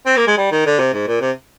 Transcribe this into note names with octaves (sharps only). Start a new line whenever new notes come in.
C4
A#3
G#3
G3
D#3
D3
C3
G#2
A#2
C3